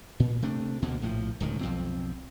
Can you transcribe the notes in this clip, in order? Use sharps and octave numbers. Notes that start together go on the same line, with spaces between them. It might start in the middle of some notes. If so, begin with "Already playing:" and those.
A#2
C3 A3 D4
D2 B2 D3 A#3
A#1 A2 F3
D1 C#2 D#3
B1 F2 C4